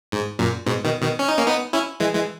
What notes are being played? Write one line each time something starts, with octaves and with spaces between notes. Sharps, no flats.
G#2
F#2 A#2
G#2 B2
B2 D#3
B2 D#3
C#4
D#4
A#3 C#4
B3 D#4
C#4 E4
E3 G#3
E3 G#3